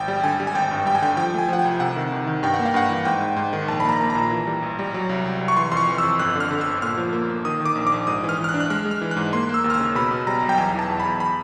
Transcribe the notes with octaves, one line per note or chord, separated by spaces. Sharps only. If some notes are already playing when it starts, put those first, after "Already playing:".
Already playing: G#1 G5
G3
D3 G#5
G3
G#5
G#1 G5
G2
G3 G5
G#5
D3 G5
F3 G5
A3 G#5
F3 F#5
G5
C2
C3 F#5
D#3
D#3
D#3
G2 G5
F#5
A#3
F5
G2 F#5
E3
G#2 G5
G#2
G#2
D#3
A#1 A5
B5
A#3 A#5
A#3
A#5
A#2
E3
G3
A1
G3
F#3
C2
C2
C2
C#6
E3 C6
F2 C6
C#6
E3
F2 E6
G1 F#6
D3
F6
D3
G1 E6
A#2 F6
F3
A#3
A#3
D#3 D#6
D#3 D6
A#1
D6
A#1
G#2 D#6
E3
F6
E3
F6
F#6
D4
F#6
G#3 F6
G#3
F6
E3
F#6
G#2
A#3 C6
A#3
E6
D#2
F6
E6
C#3
B2 B5
B2
G3 A#5
B1
G5
E2 G#5
E3 A5
E2
B5
E2
B5